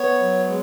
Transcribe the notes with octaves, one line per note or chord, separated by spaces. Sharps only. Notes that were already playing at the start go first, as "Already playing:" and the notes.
Already playing: B3 C#5
F#3
G#3